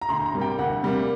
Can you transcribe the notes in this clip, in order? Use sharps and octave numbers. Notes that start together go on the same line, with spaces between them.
A#5
D2 C6
A#5
C3 G3 A#3
G5
D2 F#5
C3 G3 A#3